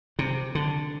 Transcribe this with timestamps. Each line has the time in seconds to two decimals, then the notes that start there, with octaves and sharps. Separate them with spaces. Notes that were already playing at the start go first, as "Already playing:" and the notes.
0.19 C3
0.55 D3